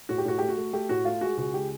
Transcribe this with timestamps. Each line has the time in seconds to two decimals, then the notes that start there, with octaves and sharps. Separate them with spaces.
0.09 A2 F#4
0.18 G4
0.25 A2 F#4
0.38 A3 G4
0.49 F#4
0.57 A3
0.73 A3 G4
0.89 A2 F#4
1.05 A3 F4
1.21 G#3 F#4
1.37 C#2 F#4
1.54 G#3 G4